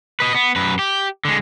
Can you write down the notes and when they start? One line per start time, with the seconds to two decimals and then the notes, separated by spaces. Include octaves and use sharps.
0.20 B4 D#5
0.35 B3
0.56 F#2 B4
0.79 G4
1.25 D3 G#3